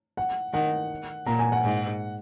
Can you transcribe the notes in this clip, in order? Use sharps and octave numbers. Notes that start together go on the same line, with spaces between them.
F#5
D#3 F#5
A#2 A#5
G#5
F#5
G#2